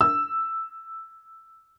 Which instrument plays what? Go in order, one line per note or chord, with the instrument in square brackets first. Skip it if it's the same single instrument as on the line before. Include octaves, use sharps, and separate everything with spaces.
[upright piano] E6